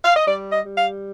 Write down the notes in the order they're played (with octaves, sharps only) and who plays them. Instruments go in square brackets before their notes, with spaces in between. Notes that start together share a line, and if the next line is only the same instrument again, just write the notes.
[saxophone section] F5
D#5
G3 D5
D#5
G3
F5